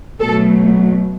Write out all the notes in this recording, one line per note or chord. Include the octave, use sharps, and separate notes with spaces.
B2 F#3 A3 A4